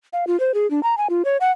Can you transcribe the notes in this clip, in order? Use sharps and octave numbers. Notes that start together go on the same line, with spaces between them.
F5
F4
C5
G#4
D4
A#5
G#5
F4
C#5
F#5